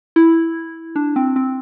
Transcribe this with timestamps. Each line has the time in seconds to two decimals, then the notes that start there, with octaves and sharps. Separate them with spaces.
0.16 E4
0.96 D4
1.16 C4
1.36 C4